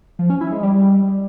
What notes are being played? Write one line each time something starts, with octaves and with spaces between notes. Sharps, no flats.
F3
C#4
E4
G#3
G3